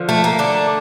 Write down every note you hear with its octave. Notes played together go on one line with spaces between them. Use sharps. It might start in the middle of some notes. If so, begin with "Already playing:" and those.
Already playing: D3 F3
A3
A#3
D3 A3 D4